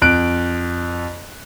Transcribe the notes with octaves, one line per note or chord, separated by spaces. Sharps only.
F2 F#6 D7